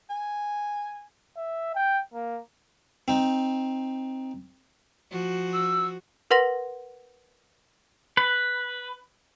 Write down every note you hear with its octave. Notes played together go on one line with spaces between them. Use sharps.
G#5
E5
G5
A#3
C4 D#4
F3 F#4
E6
A#4 B4 F#5 C6 A#6
B4